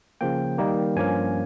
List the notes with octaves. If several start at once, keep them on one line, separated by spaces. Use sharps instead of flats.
C#3 F3 A#3 G5
D#3 G3 A#3 D#4
G2 F3 A#3 C#4 G#5